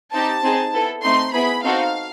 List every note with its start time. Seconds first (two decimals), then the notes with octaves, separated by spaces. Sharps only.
0.13 C4 D#4 G4 A5
0.43 C4 D#4 G#4
0.74 B3 E4 A4
1.03 A3 C4 D#4 C6
1.34 B3 E4 G#4 B5
1.64 C4 D#4 F#4 A4 F5